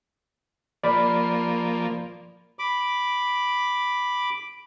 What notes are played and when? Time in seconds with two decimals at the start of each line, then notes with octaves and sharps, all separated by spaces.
0.84 F3 A#3 D5 B5
2.59 B5 D6